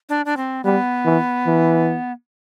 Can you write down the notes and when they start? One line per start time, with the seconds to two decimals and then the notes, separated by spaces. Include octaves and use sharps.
0.09 D4
0.26 D4
0.37 C4
0.64 G3 B3
1.05 E3
1.47 E3